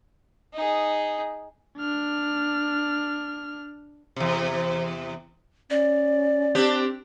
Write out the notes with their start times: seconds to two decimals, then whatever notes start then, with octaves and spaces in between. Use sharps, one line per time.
0.54 D#4 G#4
1.78 D4 F6
4.16 E2 C3
5.70 C#4 D5
6.55 C4 D4 G4